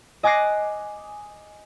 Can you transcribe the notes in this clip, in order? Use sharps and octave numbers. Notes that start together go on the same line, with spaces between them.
D#5 G#5 D6 F#6 A#6 C7